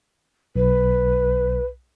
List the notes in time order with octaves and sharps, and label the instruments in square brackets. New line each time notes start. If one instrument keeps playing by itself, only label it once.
[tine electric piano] B1 [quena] B4